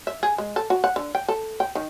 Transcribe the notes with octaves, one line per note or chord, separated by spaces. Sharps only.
E5
G#4
G#3
A4
F#4
F#5
D3
G5
A4
G5
D#3